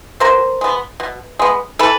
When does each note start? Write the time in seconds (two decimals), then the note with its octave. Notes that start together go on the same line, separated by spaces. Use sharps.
0.20 B2 A#4 C5
0.61 G#3 B3
1.00 B2
1.39 G#3 B3
1.79 E3 A4 B4